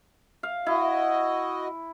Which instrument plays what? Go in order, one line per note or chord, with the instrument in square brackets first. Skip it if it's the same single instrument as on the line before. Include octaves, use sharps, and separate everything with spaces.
[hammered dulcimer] F5
[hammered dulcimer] E4 [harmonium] F#4 D#5